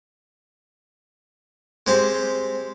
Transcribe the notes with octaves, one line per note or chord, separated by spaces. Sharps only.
G#3 C4 G4